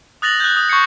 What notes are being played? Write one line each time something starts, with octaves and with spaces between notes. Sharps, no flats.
D#6 F#6 A6 A#6 F7 F#7
F#6 G6
D#6
C#6 G6 G#6 C7 C#7 F#7